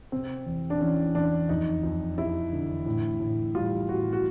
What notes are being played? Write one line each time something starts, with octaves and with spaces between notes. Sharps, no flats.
C3 C4
E2
D4
E3 C#4
E2 D4
F2 D#4
F2
F2 E4
D3
A2
A2
G3 F4
A2 F#4
F#4